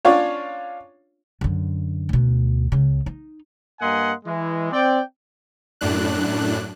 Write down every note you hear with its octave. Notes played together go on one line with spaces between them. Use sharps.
C#4 D4 F4 C#5
F#2 D3
D2 B2
C#2 C#3
D#4
G2 A#3 D#5 F#5 G#5 C6
E3 G#3
C4 D5 G5
F#2 A2 D4 F#6